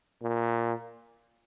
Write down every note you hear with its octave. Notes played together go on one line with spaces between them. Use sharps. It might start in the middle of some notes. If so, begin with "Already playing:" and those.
A#2